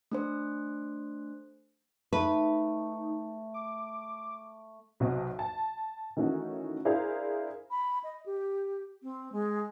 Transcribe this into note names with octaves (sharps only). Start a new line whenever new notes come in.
A3 D4 C5
A3 D#4 B4
D6
B1 C3 F#3 F#4 C5 D#5
A5
D#3 E3 A3 C#4 D#4 F#4
D4 E4 G#4 A#4 C5 F5
B5
D#5
G4
C4
G#3